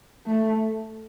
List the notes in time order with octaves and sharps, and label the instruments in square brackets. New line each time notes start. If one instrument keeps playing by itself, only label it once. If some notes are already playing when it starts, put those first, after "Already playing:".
[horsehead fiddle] A3